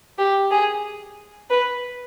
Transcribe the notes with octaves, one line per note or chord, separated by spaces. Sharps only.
G4
G#4
B4